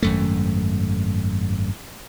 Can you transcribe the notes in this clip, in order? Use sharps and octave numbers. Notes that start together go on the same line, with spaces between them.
G#1 F#2 A3